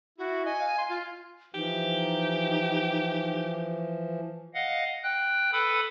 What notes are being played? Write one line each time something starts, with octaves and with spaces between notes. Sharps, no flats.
E4 F#4
D#5 G#5
F5
C6
F4
E3 F3 D#4 G4
D#5 F5 F#5
G5 F#6
A4 B4 B5 D#6